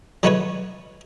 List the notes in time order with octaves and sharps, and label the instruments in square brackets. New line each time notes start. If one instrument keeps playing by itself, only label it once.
[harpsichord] F#3 G#3 A3 F#4 B4 C#5